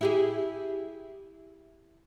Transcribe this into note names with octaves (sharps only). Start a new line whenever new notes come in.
E4 G4 G#4